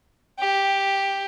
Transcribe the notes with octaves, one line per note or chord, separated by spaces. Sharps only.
G4